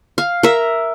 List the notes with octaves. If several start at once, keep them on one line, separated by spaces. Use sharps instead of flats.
F5
A#4 E5